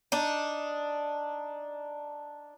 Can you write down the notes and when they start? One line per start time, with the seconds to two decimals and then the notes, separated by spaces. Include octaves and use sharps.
0.12 D4 D#4